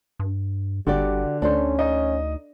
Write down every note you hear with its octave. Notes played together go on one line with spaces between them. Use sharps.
G2
G1 D3 G3 F#4 G4 D5
D2 C#4 D4 A4 C5
D#4 D#5